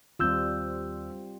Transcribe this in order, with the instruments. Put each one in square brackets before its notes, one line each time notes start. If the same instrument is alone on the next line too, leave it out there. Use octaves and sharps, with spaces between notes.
[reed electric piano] D#2 E6 G6 [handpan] G3 C4 F4